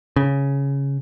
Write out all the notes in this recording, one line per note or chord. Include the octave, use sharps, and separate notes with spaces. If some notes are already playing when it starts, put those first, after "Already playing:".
C#3